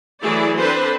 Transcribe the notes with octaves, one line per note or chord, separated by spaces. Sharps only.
E3 F#3 A3 E4 G#4 D5
C4 D4 A4 B4 C5